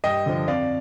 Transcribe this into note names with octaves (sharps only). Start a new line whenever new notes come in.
G2 D#5 G5
D3 F3
F2 D5 F5